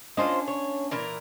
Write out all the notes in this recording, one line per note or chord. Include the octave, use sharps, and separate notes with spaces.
A#3 C#4 D4 F4 C5 D#5
C#5
A#2 E3 A#4